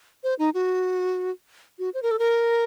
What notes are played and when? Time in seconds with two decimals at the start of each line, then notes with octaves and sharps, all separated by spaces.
0.24 C5
0.39 D#4
0.54 F#4
1.79 F#4
1.94 C5
2.03 A#4
2.11 A4
2.19 A#4